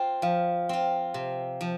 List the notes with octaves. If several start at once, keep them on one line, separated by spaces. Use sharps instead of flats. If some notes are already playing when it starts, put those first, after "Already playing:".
Already playing: C4 F4
F3 F5
C4 F4
C3
F3